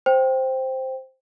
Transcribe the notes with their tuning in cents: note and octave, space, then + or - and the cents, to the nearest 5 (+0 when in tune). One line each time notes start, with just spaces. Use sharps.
C5 +0 G5 +0